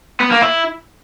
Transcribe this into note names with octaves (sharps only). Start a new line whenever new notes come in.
B3
A#3
E4